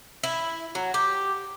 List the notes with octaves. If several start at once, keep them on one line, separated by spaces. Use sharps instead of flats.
E4
F#3
G4